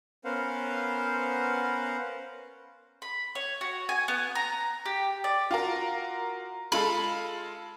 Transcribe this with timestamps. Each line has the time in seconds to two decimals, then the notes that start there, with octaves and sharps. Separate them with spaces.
0.25 B3 C#4 A#4 C5 F5 F#5
3.02 B5
3.35 C#5
3.61 F#4
3.89 G#5
4.08 B3
4.35 A#5
4.86 G4
5.24 D5
5.51 F4 F#4 A#4
6.72 G#3 F4 A4 B5